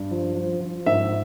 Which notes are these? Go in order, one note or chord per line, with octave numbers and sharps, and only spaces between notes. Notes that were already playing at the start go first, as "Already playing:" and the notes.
Already playing: G2
F3
F3
F3
G#2 E5